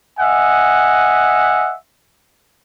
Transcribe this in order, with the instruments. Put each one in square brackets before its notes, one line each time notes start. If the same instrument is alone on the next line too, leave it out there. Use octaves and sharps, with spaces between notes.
[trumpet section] D#5 E5 F#5 G#5